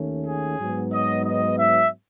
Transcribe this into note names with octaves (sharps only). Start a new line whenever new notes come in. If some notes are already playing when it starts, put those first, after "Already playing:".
Already playing: D#2 D#3 A3 C#4
G#4
G#2 F#3 B3
D#5
D#5
E5